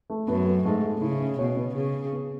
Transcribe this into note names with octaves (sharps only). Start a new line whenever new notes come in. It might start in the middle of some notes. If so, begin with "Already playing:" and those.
A3
F#2 B3
B4
G#2 A3
A3
C#3 E4
C#4
B2 C#5
B3
C#3 G#4
C#4
B3